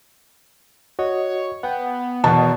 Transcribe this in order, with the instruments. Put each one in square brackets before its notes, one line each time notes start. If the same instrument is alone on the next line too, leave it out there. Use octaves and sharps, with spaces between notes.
[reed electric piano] F#4 D#5 [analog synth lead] C#5
[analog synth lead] B3 [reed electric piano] F#5 G5
[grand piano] E2 B2 [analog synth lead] D#3 [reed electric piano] D#5 F#5 [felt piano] A5